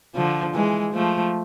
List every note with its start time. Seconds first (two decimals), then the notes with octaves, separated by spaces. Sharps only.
0.15 D3 F3
0.54 E3 G#3
0.94 F3 A3